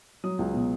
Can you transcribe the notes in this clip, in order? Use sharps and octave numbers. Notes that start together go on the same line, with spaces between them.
F#3 D#6
C#2
B2